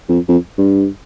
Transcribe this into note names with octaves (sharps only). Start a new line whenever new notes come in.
F2
F2
G2